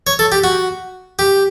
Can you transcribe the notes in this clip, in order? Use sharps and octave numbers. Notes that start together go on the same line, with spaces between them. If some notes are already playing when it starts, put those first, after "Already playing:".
C#5
A4
G4
F#4
G4